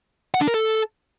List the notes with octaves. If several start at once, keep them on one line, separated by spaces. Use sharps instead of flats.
F#5
D4
A#4
A4